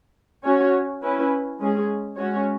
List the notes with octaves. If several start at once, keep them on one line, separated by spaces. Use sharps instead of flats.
C#4 F#4 C#5
C#4 E4 B4
G#3 C#4 G#4
G#3 C#4 F#4 C#5